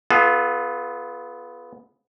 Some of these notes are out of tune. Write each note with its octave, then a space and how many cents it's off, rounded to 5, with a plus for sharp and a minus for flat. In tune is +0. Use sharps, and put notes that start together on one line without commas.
B3 +0 F4 +0 A4 -45